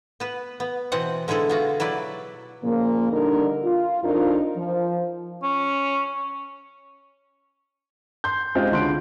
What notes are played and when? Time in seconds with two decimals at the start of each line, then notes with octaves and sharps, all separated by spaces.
0.20 B3 B4
0.60 B3
0.92 B2 E3 C4 F#5
1.28 D3 G#3 E4 G#4 A4
1.49 B3 F4 F#4
1.80 F#3 E4 B4 D5
2.64 A#2 C#3 F3 A#3
3.12 D3 G3 D4 D#4 A#4
3.64 F4
4.04 F2 D4 D#4 F4 A#4
4.57 F3
5.43 C#4
8.24 C6 G6
8.55 G#3 C4 D#4 F4 G4
8.72 C#2 D3 C6 F#6 D7